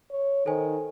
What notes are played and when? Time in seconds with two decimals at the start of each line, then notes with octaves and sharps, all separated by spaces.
0.11 C#5
0.46 D#3 A4 C5 G#5